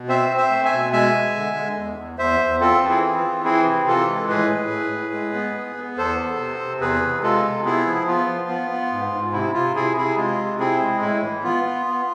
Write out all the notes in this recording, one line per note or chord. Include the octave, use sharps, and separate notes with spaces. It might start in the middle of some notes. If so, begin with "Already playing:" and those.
Already playing: B2
C4 C5 E5
C4
C5 E5
A3
E5 G#5
B2
G#3 E5 G#5
G#3
D3
G#3
E2
E2
E2 C5 E5
E2
C4 F4 A4
E3
E4 G#4
C4
F4
E3
C4 E4 G#4
C3
E3 F4 A4
G#3
A2 G#4 B4
A2
A2
A2
G#3
B3
B3
B3
E2 A4 C5
B3
C3
C3
E2 G#4 B4
C3
G#3 F4 A4
C3
B3 E4 G#4
F3
B3 F4
F3
B3
B3
G#2
G#2
C3 E4
C3 F4
C3 E4 G#4
C3 E4 G#4
G#3 F4
C3
C4 E4 G#4
G#3
A2 E4
E3
B3 F4
B3
B3